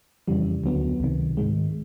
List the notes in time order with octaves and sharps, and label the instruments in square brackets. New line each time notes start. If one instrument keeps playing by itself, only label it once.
[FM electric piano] F2 C#3 E3 G3
D2 D3 F#3 B3
C#2 C3 D#3
G#2 D#3 G#3